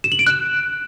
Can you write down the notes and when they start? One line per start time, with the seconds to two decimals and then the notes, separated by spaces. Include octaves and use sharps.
0.04 E7
0.12 F#7
0.19 D7
0.27 F#6